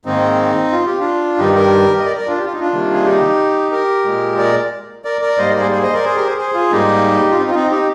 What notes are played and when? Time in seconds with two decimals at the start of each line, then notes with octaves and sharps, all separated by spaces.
0.05 G#2 D#3 A#3 C4 D#4
0.72 F4
0.86 G4
0.99 D4 F4
1.38 G2 D#3 G3 D#4 G4
1.55 G4 A#4
1.99 D#5
2.05 A#4 D5
2.16 A#4 D5
2.27 D4 F4
2.38 G4
2.46 F4
2.53 D#4
2.60 D4 F4
2.72 C3 D#3 G3 A#3
2.93 G#4
3.05 D#4 G4
3.71 G4 A#4
4.05 A#2 G#3
4.38 A#4 D5
5.04 A#4 D5
5.22 A#4 D5
5.38 G#2 G3 A#3 C5 D#5
5.49 A#4 D5
5.60 G#4 C5
5.71 G#4 C5
5.82 C5 D#5
5.93 A#4 D5
6.05 G#4 C5
6.16 G4 A#4
6.27 G#4 C5
6.38 G#4 C5
6.54 F4 G#4
6.71 G#2 G3 A#3 D#4 G4
7.30 F4
7.38 C4 D#4
7.50 F4
7.55 C4 D#4
7.71 D#4 G4